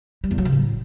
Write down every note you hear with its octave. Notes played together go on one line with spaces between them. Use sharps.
G3
E2
F#3
C#3
A2